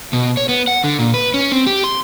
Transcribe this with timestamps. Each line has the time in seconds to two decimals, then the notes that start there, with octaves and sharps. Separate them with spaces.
0.13 B2
0.37 C#5
0.49 B3
0.68 F#5
0.84 D3
0.99 A#2
1.14 B4
1.34 C#4
1.52 C4
1.66 G4
1.84 C6